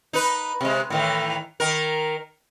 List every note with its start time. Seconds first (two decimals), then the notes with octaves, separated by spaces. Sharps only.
0.13 D#4 B4
0.61 C3 G#3
0.90 A2 D#3 E3
1.60 D#3 A#4